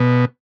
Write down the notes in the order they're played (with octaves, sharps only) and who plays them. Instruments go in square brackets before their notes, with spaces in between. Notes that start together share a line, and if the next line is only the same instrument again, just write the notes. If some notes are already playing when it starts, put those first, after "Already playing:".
Already playing: [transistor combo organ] B2